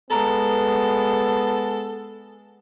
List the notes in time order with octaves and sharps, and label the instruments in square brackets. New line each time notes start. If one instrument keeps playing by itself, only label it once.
[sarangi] G#3 [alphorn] B3 [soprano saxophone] A4 [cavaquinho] B4 A#5 D6